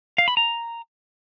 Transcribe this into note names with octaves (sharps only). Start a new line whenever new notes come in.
F5
B5
A#5